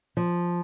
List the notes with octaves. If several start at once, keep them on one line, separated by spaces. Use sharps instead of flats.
F3